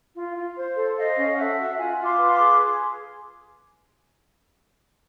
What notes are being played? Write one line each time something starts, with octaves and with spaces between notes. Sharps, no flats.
F4
F4
C5
A4
C5 D#5 F5
C#4
A4 E5 F#5
F#4
F4 F#5 G#5
F4
C6 D6
B4
C6 D6
G#4